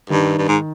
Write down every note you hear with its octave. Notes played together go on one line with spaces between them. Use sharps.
G2 D#3
G2
G#2